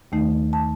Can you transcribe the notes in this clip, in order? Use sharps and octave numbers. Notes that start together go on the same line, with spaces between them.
D#2 D#3 A3 D#4
A5